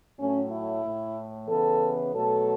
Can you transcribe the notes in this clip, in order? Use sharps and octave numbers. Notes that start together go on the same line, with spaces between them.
A2 F#3 A3 C#4
E4
A2 A3
C#3 E3 B3 A4
B2 F#3 A3 A4